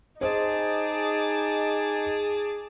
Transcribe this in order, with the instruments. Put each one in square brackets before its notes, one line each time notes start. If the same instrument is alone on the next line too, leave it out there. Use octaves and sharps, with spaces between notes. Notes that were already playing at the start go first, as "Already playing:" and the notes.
[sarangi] D#4 [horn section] G#4 [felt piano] C5 D#5 [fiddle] A5 D6